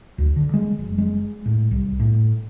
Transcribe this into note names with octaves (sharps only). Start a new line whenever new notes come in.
D2
D3
G#3
F#1
G#3
A2
C2
A2